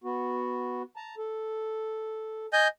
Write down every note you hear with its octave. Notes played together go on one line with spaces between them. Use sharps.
B3 F#4
A5 A#5
A4
D#5 G#5 G6